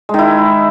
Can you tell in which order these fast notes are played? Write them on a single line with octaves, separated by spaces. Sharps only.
G#3 D#3 E4